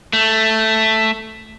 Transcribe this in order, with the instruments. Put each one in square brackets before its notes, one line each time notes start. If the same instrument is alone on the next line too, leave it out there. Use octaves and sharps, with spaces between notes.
[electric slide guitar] A3